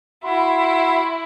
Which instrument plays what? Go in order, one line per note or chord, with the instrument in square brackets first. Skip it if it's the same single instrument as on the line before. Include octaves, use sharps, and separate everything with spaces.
[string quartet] E4 [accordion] F#4 B5 C6